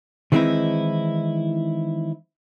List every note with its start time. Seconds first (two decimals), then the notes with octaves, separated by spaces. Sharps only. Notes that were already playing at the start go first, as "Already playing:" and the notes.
0.32 D#3 E3 G#3 C4 D#4 E4